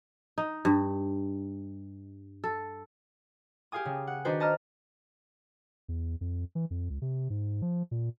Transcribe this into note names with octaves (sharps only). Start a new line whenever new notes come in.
D#4
G2
A4
G4 G#4 F5 G#5 D#6
C#3
F#5
D#3 D4 D#4 F#4 B4 C5
D#5 A5 A#5 F6
E2
F2
E3
F2
C#2
C3
G#2
F3
A#2